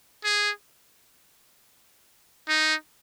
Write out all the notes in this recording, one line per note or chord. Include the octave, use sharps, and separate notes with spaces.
G#4
D#4